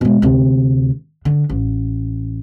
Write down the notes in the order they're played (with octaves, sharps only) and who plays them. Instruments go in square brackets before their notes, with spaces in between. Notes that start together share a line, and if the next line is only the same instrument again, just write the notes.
[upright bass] B2 G#3
D2 C3
D3
A1